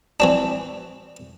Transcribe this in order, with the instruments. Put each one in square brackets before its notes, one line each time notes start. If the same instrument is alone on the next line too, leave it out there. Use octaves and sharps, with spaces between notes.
[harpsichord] E3 C4 D4